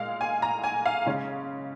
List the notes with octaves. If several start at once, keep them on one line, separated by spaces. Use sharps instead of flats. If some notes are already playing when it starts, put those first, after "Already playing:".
Already playing: A#2 G#3 F5
G#5
A#5
G#5
F5
C#3 G#3 C#4